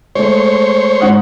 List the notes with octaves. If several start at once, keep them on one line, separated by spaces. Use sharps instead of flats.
G#3 A3 C5 C#5
G#2 F#5 D#6